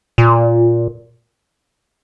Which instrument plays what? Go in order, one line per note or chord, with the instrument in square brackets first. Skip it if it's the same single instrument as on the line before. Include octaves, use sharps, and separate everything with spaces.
[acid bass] A#2